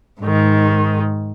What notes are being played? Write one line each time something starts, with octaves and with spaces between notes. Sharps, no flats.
G#2 D#3